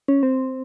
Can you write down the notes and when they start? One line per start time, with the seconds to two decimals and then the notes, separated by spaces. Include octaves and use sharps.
0.08 C#4
0.23 C4